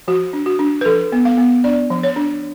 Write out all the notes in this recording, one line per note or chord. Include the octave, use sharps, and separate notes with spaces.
F3 F#4
D4
F#4
D4
B4
F3 A4
B3
F5
B3
D4 D5
F3
C#5
D4